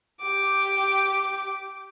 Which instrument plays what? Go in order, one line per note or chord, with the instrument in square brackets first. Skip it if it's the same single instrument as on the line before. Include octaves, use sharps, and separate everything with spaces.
[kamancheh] G4 D6